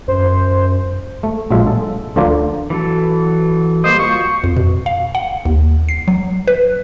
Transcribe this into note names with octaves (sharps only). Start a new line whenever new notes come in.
F#2 C5
A3
A#1 F#3 G#3 F4 E5
A4
D2 D3 F3 F4 A#4 D5
E3 F#3 A4
G3 A#3 C5 D#5
F4 F#4 C#6
F2
B2
F5
F#5
D#2
C7
F#3
B4